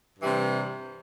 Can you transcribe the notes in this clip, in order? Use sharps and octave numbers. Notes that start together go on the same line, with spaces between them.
G2 C3 E3 G3